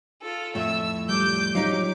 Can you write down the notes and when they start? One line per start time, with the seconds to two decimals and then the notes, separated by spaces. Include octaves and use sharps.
0.21 F4 A4
0.55 F2 A2 E5 E6
1.09 G3 D6 G6
1.55 F3 F#3 D#4 G4 D6